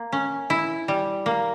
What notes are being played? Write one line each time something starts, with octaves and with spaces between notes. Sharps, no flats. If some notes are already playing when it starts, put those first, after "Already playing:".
Already playing: A#3
C#4
E4
G3
A#3